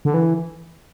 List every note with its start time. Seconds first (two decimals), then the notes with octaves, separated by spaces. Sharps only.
0.05 D3
0.14 E3